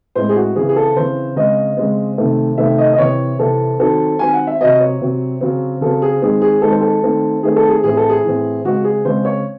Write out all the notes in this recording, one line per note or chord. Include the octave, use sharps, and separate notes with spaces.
A2 G#3 C4 C5
G#4
F#4
C#3 E3 C4 G#4
G#4
A4
C#3 E3 C4 C5
C#3 G#3 C4 D#5
C#3 G#3 C4
C3 D#3 A3 C4
C3 D#3 A3 C4 E5
D#5
D#5
C3 E3 C4 C#5
C3 E3 C4 A4
D#3 F#3 C4 A4
D#3 F#3 C4 G#5
F#5
E5
C3 F#3 C4 D#5
C#5
C3 F#3 C4
C#3 F#3 C4
C#3 F#3 C4 A4
G#4
D#3 G#3 C4 G#4
G#4
D#3 G#3 C4 A4
C5
A4
D#3 A3 C4
D#3 A3 C4 G#4
A4
G#4
A2 E3 C4 G#4
A4
G#4
A2 E3 C4
C#3 G#3 C4 F#4
G#4
C#3 G#3 C4 C5
C#5